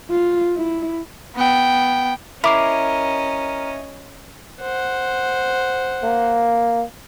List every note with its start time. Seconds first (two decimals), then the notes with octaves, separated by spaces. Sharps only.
0.11 F4
0.57 E4
1.36 B3 G5
2.44 C#4 E4 A#4 D#5 B5 D6 C7
4.61 C5 F#5
6.04 A#3